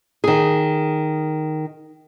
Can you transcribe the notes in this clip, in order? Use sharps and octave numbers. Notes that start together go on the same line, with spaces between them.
D#3 G#4